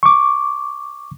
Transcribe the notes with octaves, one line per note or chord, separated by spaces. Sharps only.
C#6 D6